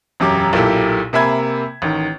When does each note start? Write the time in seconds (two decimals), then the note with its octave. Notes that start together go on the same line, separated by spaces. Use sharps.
0.20 E1 F#2 G4 D6
0.53 B1 A#2 A#3 E4 G4 A4
1.13 C3 A#3 E5 G#5 B5 G#6
1.82 A1 D#3